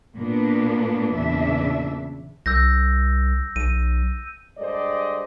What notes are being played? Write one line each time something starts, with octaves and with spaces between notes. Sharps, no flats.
A#2 A#3 B3 D4
E2 A#2 C#3 D4 E5
C2 E6 G6 A#6
B1 D#7
G2 G#3 A4 C5 D5 D#5